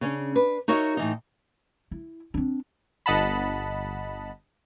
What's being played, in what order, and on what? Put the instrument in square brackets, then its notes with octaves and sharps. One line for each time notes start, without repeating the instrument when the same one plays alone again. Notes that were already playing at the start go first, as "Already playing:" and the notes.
[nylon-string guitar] C#3 C#4 D4
D4 B4
D#4 F#4 A#4 C#5 D#5 E5
A2 E3 D#4
[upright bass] E4
C4 D4
[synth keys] G1 D#5 F#5 A5 B5